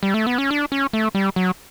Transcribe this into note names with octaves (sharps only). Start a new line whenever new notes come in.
G3
A3
B3
C#4
D4
C#4
A3
G3
F#3